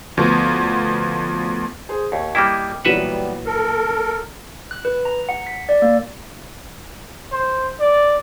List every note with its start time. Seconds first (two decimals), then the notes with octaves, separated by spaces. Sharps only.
0.17 D2 F3 B3
1.89 G#4 C5
2.12 D#2 C#5
2.35 G3 A#3 E4 D#5 G5 D6
2.85 A#2 E3 F#3 G3 B3 B4 E5 F#5
3.46 A4 A#4
4.71 F#6
4.85 B4
5.05 A#5
5.29 F#5
5.47 B6
5.69 D5
5.82 A#3
7.31 C5
7.80 D5